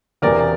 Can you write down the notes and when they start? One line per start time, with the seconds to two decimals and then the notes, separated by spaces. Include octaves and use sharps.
0.22 E1 E2 C3 E3 A#4 D5